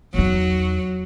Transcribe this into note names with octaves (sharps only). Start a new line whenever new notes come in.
E2 F#3 D#4